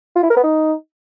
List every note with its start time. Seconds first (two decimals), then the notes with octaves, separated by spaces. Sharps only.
0.16 F4
0.23 E4
0.30 A#4
0.37 B3
0.43 D#4